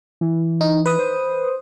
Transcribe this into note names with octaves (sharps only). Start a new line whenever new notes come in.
E3
D#4
B4 D#6
C5